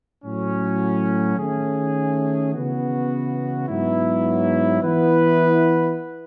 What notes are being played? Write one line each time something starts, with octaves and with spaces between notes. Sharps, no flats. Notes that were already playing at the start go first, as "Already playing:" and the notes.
A2 F#3 C#4
D#3 A3 C#4 G#4
C#3 E3 B3 F#4
G#2 F#3 B3 E4
E3 B3 E4 B4